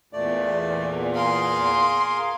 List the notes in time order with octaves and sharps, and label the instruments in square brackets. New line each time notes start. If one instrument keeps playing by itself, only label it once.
[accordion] E2 A#2 [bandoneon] A3 D5
[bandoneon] G#4 A#4 F5 [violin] C6